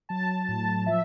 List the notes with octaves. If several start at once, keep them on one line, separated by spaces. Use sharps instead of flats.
F#3 A5
A2 A5
F3 E5